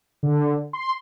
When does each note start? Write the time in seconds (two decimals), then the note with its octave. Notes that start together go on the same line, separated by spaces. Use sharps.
0.23 D3
0.73 C6